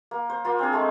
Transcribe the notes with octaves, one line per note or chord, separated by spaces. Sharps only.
A#3
C5
A#3 F4 C6
C4 D4 G#4
G#3 A3 G#4